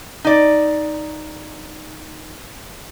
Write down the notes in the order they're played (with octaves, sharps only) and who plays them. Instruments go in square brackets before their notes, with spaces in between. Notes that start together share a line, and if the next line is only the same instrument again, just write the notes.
[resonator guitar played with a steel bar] D#4 D5